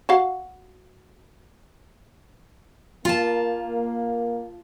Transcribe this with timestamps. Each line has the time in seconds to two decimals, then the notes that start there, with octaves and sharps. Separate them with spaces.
0.09 F#4 F5 F#5
3.05 A#3 F4 A5